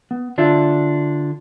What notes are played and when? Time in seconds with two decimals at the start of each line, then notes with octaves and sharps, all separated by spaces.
0.11 B3
0.38 D3 D4 F4 E5